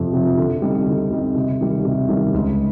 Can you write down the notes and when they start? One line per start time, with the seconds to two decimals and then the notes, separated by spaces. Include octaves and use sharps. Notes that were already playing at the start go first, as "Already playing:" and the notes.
Already playing: F2 C3 F3
0.13 C3 F3
0.38 D3
0.62 G3 C4 D#4
0.87 D3
1.11 G3 C4 D#4
1.35 C3
1.61 D#3 G3
1.85 C3
2.08 D#3 G3
2.34 C#2